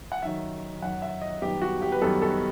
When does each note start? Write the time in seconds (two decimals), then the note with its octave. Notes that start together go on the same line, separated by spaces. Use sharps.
0.12 F#5
0.23 F#2 D#3 F#3 E5
0.82 F#2 D#3 F#3 F#5
1.02 E5
1.22 D#5
1.42 F#2 D#3 G3 B3 G4
1.62 F#4
1.82 G4
1.92 B4
2.01 F#2 D#3 G3 B3 A4
2.22 A4